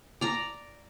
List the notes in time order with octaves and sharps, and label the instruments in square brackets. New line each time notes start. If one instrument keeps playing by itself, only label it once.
[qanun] D5 A#5